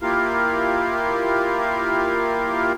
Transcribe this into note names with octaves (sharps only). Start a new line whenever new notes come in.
A#3 E4 F4 G4 A#4 F5